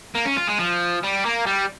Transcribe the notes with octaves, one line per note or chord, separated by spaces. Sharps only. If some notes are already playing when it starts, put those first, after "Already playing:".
A#3
C#4
F4
G#3
F3
G3
A#3
G3